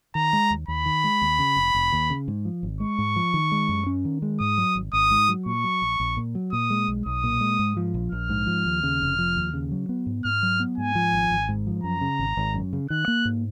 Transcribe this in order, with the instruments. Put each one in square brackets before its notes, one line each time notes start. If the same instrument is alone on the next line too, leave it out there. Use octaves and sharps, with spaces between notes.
[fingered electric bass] D#3 [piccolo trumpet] A#5
[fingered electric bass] G#3
D#2
[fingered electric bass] D#2 [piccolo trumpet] B5
[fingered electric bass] D#3
G#3
D#2
C#3
F1
F1
D#2
C#3
G#2
F3
G#1
[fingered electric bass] G#3 [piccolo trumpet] C#6
[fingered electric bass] G#2
F3
D#3
G#3
F#2
C#4
D#3
G#3
[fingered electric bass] G#2 [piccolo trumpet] D#6
[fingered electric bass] F#3
G#1
[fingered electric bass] G#1 [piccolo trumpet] D#6
[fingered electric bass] G#2
F#3
[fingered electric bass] A#2 [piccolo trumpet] C#6
[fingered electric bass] F#3
A#1
A#1
A#2
F#3
[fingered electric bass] A#2 [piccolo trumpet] D#6
[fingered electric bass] G#3
B1
[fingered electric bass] B1 [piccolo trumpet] D#6
[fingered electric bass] A#2
G#3
G#2
F3
A#1
[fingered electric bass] A#1 [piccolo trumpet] F6
[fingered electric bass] G#2
F3
D#2
C#3
F1
F3
D#2
C#3
F#3
B3
G#2
[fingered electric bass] G#2 [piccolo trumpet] F6
[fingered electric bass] F#3
B3
[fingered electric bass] G#2 [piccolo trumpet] G#5
[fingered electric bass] F3
G#1
G#1
G#2
F3
[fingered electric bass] F#2 [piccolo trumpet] A#5
[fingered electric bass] C#3
G#1
G#1
F#2
C#3
[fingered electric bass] D#3 [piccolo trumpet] F#6
[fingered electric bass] A#3
G#2